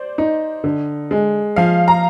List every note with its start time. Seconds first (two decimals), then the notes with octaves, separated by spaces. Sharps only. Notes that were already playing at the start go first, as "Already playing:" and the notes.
Already playing: C5 D5
0.18 D#4
0.64 D3
1.11 G#3
1.56 F3 F5
1.88 A#5